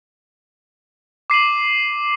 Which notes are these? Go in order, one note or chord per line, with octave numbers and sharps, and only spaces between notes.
D6 C7 D#7 F#7